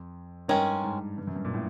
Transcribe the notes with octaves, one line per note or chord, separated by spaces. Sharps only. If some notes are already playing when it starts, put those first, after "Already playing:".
Already playing: F2
G2 D#3 G#3 C#4
G#2
G2
F#2
G2
A#2
A2